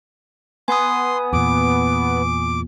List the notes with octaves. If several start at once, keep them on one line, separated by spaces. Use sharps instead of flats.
B3 G#5 C6 D#6
E2 A#2 D6